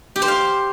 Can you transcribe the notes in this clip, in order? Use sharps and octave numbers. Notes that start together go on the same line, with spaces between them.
G4
C5
F5